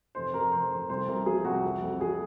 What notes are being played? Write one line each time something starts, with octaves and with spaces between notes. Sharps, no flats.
F1 C5
F1 A#4
F1 C5
F1 C5
C2 C5
C2 A#4
F3 G#4
C2 F#4
F2
F2
F2 G#4